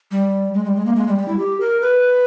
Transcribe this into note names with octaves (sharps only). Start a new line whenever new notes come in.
G3
G#3
G3
G#3
A#3
G#3
G3
G3
E4
G4
A#4
B4